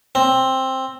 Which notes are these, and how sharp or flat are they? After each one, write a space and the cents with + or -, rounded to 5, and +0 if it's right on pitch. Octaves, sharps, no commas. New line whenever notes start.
C4 +10